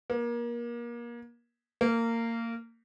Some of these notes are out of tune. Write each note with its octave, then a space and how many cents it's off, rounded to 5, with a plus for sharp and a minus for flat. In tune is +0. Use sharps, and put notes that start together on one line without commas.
A#3 +30
A#3 -20